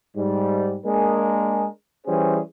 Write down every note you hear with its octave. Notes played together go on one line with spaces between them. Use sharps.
G#2 G3
G#3 A#3 D4 G#4 A#4
E3 G3 C#4 G#4 C5